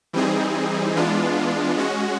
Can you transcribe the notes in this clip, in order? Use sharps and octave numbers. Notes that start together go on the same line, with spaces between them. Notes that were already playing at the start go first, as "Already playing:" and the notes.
E3 G3 C4 D#4 G#4
E3 G#3 B3 D4 F4
G#3 C#4 F#4